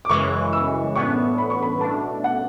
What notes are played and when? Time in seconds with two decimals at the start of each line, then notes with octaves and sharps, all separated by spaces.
0.05 D6
0.10 F#2 C#3 E3 G#3 C#6
0.53 E6
0.95 A2 E3 B3 D4 C#6
1.38 B5
1.50 C#6
1.62 B5
1.81 B2 A3 D4 A5
2.24 F#5